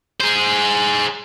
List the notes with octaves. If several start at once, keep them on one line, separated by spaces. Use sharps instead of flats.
G#4 C5